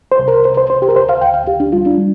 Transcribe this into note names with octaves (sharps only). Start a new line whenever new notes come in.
C5
C2
A#4
C2 C5
C5
C2 C5
G4
A#4
D2 C5
F5
D2 G5
F5
D2 G4
D4
G3 F4
D4
G3